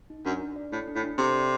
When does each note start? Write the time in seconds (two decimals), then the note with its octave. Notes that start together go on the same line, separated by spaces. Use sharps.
0.10 D#4
0.26 F#2 D4
0.41 D4
0.56 D5
0.72 A2 A4
0.87 D4
0.95 A2
1.04 D4
1.18 C3 A4
1.34 D5